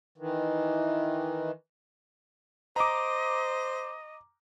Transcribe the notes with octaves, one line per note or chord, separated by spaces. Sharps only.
D#3 E3
C5 D#5 A#5 D6